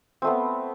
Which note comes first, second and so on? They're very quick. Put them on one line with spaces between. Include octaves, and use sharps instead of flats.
C4 A3 B3